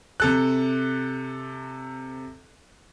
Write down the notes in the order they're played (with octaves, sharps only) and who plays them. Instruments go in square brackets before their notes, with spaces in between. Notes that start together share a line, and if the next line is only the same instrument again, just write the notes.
[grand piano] C3 A4 F#6